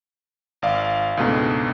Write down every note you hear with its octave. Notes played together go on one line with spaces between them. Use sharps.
G#1 D5 F5
C#2 G#2 B2 A3 D4